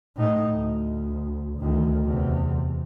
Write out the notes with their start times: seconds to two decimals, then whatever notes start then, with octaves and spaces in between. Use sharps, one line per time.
0.16 A2 D#4
0.54 D2
1.59 D2 D#3
2.05 E2 C3